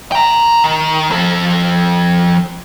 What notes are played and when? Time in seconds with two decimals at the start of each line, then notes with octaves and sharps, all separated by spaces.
0.12 G5 A#5
0.64 D#3
1.11 F3 A4